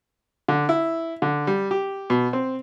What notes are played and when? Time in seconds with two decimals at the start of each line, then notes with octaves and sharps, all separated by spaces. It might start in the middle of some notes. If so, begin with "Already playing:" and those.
0.48 D3
0.69 E4
1.22 D3
1.47 G3
1.71 G4
2.10 B2
2.33 C4